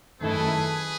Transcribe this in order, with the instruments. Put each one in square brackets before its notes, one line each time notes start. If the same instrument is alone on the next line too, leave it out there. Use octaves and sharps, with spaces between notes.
[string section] F#2 D#3 A3 E4 A4 [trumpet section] G#4 B4